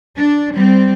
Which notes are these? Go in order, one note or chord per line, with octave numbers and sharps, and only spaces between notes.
D4
G3 C4